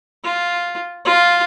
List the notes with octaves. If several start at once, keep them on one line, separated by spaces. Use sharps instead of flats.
F4
F4